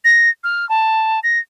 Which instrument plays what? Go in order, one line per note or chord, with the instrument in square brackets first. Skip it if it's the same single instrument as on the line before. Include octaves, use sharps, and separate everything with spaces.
[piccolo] A#6
F6
A5
A#6